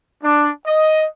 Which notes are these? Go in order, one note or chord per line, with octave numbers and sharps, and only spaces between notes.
D4
D#5